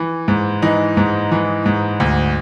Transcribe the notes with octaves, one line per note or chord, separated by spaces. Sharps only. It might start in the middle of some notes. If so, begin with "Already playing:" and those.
Already playing: E3
G#2
E3 D#4
G#2
E3
G#2
D2